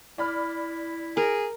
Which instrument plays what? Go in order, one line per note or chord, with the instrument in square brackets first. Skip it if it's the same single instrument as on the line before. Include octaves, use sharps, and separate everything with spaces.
[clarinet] E4 [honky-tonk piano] D5 B5 F6
[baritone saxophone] G#4 [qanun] A#4